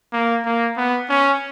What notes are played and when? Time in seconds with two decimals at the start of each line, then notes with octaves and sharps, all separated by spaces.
0.13 A#3
0.46 A#3
0.77 B3
1.10 C#4